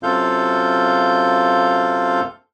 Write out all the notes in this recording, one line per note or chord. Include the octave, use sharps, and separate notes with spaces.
F#2 C3 F4 A4 F5 G6